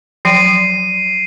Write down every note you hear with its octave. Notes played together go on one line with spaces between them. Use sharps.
F3 F#3 G5 C7 D7 D#7